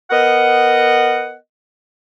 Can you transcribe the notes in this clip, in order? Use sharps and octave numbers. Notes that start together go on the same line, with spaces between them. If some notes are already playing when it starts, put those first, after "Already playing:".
B3 A#4 D#5 F#5